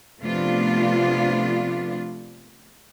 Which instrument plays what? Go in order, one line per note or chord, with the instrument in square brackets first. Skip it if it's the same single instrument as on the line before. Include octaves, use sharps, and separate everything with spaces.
[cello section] C3 F3 A3 B3 D4 F4